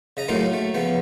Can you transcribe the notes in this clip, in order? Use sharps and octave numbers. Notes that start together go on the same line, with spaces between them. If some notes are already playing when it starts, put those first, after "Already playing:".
C#3 D#5 A#5
A2 F#3 A#3 D#4 F4
A3
C#3 F3 B3